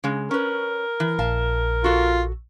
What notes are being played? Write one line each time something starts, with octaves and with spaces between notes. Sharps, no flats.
C#3 G#3
C#4 A#4 B4
E3
A#1 F5 A5
F4 F#4 A4